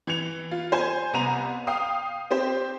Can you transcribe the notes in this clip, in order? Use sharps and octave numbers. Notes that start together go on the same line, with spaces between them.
E3 G#6 C#7 F7
F4
C5 G#5 G#6
C2 B3 A#5 D#7 F7
F5 G5 D#6
C4 G4 C5